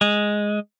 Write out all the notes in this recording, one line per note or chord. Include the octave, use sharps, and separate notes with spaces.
G#3